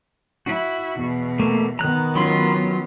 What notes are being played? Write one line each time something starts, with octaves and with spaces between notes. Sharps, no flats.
E4 F#4
E2 B2
A3 A#3
D#3 B3 A#5 F#6
F#3 C#4 F4 B5 C6